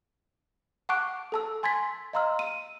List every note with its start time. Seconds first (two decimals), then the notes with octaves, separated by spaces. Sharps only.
0.89 F#5 A5 C#6 D6 F#6 D7
1.32 A4 A5 E6
1.63 G#5 C6 G#6 A6 B6
2.13 D#5 F5 A#5 C6 E6 F6
2.39 D#7